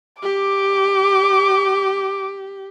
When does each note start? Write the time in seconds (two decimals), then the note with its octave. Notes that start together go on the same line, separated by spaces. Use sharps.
0.23 G4 D6